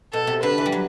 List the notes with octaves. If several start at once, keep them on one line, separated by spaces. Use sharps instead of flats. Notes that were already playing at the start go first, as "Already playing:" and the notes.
B2 A4
C3
D3 B4
E3
G3
F#3